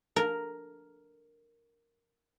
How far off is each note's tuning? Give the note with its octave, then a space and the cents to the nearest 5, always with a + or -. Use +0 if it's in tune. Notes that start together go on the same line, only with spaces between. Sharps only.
A#4 +0